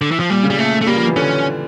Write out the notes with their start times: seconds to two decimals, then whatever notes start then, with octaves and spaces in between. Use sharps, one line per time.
0.01 D3
0.11 E3
0.20 F3
0.30 A#2 G3
0.43 C#3
0.50 G3
0.57 A#2 A3
0.81 A3
0.86 G3 A#3
0.96 F3
1.06 E3
1.16 D3 C#4